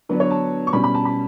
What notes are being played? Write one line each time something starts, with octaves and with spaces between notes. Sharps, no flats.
D3 F#3 B3 D4 B4
C#5
A5
C#6
B2 G3 C#4 B5
B5
A5
B5